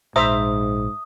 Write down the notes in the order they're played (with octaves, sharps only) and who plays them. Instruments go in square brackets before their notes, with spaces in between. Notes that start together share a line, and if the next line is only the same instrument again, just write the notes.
[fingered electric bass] A#1 [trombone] G#2 [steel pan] C5 E5 A#5 [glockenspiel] D#6